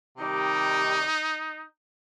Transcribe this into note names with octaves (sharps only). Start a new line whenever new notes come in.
C3 D#3 G3 D#4